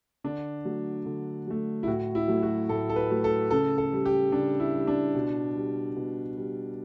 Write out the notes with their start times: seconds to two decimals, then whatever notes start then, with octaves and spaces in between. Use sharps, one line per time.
0.24 D3 D4
0.65 F#3 A3
1.06 D3
1.47 F#3 A3
1.83 E4
1.87 A2 F#4
2.15 E4
2.28 F#3 A3
2.42 F#4
2.69 A2 A4
2.89 A4
2.96 B4
3.11 F#3 A3
3.24 A4
3.51 C#3 A4
3.78 A4
3.93 G3
4.06 G4
4.32 C#3 D4
4.60 E4
4.74 G3
4.87 D4
5.15 B2
5.56 G3
5.96 B2
6.37 G3